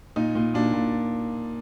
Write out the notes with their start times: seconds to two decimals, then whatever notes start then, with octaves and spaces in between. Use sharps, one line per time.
0.16 A#2 D#4
0.35 A#2
0.54 A#2 D4
0.73 A#2